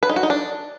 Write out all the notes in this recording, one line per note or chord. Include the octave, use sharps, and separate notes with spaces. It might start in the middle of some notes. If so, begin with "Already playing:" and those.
B4
D#4
F#4
D#4
D4